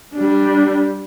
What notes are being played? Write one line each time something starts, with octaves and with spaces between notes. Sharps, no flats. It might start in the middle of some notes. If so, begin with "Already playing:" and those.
G3 D4